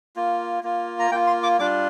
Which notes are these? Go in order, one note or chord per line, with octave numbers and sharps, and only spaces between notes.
A#3 F4
A#3 F4
A#5
A#3 F4 G5
C6
D6
G3 D4 F4 D6